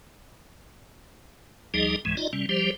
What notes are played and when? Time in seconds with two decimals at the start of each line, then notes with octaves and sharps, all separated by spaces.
1.74 D2 F3 G3 D#4 G#4 D#5
2.05 C#2 G#2 E3 G#3
2.17 D#4 F4 D5 D#5
2.33 C3 G3 C#4
2.49 F3 G3 G4 C5